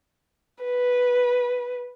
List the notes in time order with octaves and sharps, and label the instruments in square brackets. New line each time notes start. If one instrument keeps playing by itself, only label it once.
[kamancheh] B4